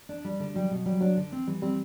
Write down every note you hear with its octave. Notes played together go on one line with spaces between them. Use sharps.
D4
G3
D3
F#3 G3
B2
F#3 G3
F#3 D4
D3
C4
E3 G3
G3 C4